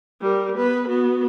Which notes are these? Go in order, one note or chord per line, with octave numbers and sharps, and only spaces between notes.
G3 A#4
B3 B4
B3 F#4